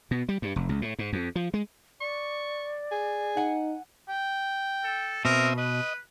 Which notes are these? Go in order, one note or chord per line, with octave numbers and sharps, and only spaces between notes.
B2
G3
G2
F1
C#2
A2
G#2
F2
F3
G#3
D5 C#6
G#4
D#4 F#5 G#5
G5
A4
B2 C4 A#4 E5 D#6
B4 D#5